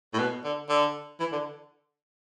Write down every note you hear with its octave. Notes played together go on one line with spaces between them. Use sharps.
A2
B2
D3
D3
E3
D3